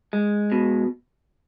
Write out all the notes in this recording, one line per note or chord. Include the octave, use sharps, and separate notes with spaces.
G#3
B2